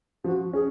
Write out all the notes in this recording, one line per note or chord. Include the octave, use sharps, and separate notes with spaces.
F3 F#4
C#4 G#4